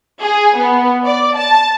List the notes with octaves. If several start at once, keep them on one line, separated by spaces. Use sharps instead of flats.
G#4
B3
D5
A5